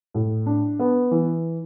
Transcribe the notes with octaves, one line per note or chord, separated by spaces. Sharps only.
A2
D4
B3
E3